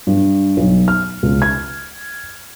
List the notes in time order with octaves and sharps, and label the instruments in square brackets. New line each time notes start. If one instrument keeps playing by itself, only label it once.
[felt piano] G2
B1
F6
C#2
G#6